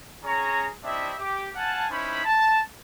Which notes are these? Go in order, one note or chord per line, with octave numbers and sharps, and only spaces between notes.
C#4 G#4 C#5 A#5
C4 D4 E4 G4 D#5 E5
G4 D6
F5 F#5 G#5 A5
C#4 D#4 E4 C5 B5
A5